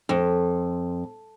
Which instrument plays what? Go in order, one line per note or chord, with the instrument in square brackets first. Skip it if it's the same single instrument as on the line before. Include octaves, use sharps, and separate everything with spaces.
[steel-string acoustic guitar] F2